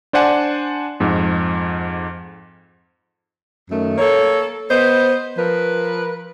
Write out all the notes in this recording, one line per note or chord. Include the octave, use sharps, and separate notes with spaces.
D4 C5 D5 F#5 G#5 A5
F2 G#2
F#2 D#3 A3
A#3 A4 C#5
B3 B4 C5 D#5
F3 A#4 B4